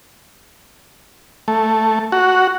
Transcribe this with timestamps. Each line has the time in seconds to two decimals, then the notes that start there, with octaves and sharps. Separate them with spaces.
1.48 A3
2.12 F#4